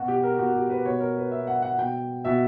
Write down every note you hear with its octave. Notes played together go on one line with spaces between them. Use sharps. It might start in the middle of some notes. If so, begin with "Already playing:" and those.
Already playing: B2 F#4
G4
A#4
B2 F#4
G4
B4
B2 C#5
A#4
B4
B2 E5
F#5
F#5
B2 G5
B2 E5